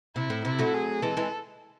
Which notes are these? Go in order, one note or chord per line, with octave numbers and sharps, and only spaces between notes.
C3 E4
A2
C3 E4
F#3 A3
G#4
E3 G#3 A4
E3 G#3